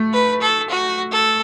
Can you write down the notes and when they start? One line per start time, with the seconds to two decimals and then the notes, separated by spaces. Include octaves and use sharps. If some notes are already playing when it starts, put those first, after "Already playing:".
Already playing: A3
0.14 B4
0.42 A4
0.70 F#4
1.12 A4